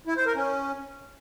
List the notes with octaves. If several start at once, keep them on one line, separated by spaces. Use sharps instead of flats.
E4
C5
A#4
C#4